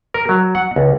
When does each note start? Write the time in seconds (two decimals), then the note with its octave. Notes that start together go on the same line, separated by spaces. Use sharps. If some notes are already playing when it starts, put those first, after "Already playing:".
0.14 A#4
0.29 F#3
0.55 F#5
0.76 C#2